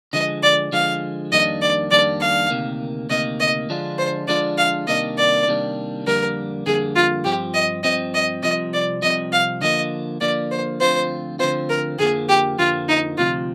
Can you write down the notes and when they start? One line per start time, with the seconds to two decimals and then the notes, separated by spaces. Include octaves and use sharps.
0.13 D3 F3 G#3 D#5
0.43 D5
0.72 D3 F3 G#3 F5
1.32 F2 D#3 G3 A#3 D4 D#5
1.62 D5
1.91 F2 D#3 G3 A#3 D4 D5
2.21 F5
2.50 D2 C3 D#3 A#3
3.10 D2 C3 D#3 A#3 D#5
3.40 D#5
3.69 D3 F3 G#3 D4 F4
3.99 C5
4.28 D3 F3 G#3 D4 F4 D5
4.58 F5
4.87 C3 D#3 G3 A#3 D4 D#5
5.18 D5
5.47 C3 D#3 G3 A#3 D4
6.06 F2 D3 G3 A#3 A#4
6.66 F2 D3 G3 A#3 G#4
6.96 F4
7.24 G2 F3 C4 G4
7.54 D#5
7.83 G2 F3 C4 D#5
8.14 D#5
8.43 C2 C3 F3 D#5
8.74 D5
9.02 C2 C3 F3 D#5
9.32 F5
9.61 D3 F3 A#3 D#5
10.21 D3 F3 A#3 D5
10.51 C5
10.80 D2 D3 F3 C4 F4 C5
11.39 D2 D3 F3 C4 F4 C5
11.70 A#4
11.98 F2 D3 F3 A#3 G#4
12.29 G4
12.58 F2 D3 F3 A#3 F4
12.89 D#4
13.18 D2 C3 F3 F4